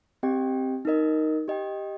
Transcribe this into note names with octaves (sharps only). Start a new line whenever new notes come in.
C4 G4 D#5 G5
D#4 A#4 D#5
G4 D#5 G5